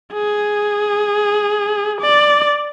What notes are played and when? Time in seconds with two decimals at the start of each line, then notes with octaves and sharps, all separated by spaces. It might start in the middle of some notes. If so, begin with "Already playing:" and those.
0.13 G#4
2.01 D5